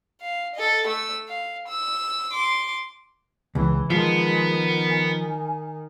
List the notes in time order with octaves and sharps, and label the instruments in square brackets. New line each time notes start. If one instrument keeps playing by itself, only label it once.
[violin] F5
A4 D#5
A3 E6
F5
E6
C6 D6
[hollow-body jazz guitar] C#2 [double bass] E3
[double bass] D#3 [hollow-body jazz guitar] F3 [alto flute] G#3 [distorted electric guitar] B3
[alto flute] G#5